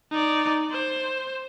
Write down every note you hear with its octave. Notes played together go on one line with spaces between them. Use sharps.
D#4 D5
C5